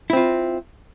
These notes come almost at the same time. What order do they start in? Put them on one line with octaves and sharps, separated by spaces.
E4 C4 F4